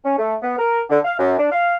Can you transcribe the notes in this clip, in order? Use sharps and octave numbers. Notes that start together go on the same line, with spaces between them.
C#4
A3
B3
A#4
D3
F5
F#2
D4
F5